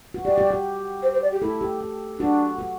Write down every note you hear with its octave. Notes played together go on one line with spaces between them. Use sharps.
F#4
G4 D5
G4
G4
C5
C5
D5
G4
E4 A4
G4
G4
D4 F#4
F#4